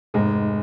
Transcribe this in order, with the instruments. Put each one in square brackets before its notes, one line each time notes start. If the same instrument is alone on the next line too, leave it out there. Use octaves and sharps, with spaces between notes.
[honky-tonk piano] F1 [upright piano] G#2 G#3